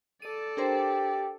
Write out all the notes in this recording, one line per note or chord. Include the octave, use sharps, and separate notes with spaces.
A4 D5 D#7
D4 G4 A#4 C5